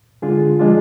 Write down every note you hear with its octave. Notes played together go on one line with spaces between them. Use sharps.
D3 G#3 D4 F4 G#4
F3 G#3 D4 F4